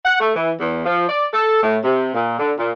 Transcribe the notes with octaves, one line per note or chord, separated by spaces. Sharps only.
F#5
A3
E3
E2
F3
D5
A4
A2
C3
A#2
D3
A#2